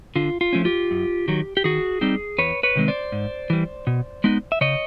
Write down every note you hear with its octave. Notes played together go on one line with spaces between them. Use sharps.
D3 F4
F4
F3 A3 C#4
F4 G4
F#2
D#3 F#3
G4
D#3 F#4 G#4
G3 C4 D#4
E2 B4 C#5
B4 C#5
C3 D#3 G#3 C4
C5 D5
G#2
E3 G3
B2
G#3 B3 D#4
E5
C#3 C#5 D#5